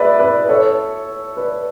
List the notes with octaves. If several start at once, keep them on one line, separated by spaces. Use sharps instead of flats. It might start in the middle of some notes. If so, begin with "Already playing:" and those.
Already playing: E4 G#4 B4 D5
B4 D5
A4 C#5
B4 D5